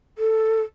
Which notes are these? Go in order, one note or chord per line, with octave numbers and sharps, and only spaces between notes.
A4